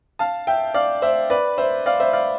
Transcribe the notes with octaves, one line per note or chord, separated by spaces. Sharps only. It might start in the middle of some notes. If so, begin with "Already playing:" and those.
F5 A5
E5 G5
D5 F5
C5 E5
B4 D5
C5 E5
D5 F5
C5 E5
D5 F5